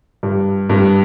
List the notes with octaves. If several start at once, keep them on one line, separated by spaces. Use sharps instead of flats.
G2
G2